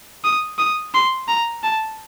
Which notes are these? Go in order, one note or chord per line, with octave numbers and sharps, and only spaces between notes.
D#6
D#6
C6
A#5
A5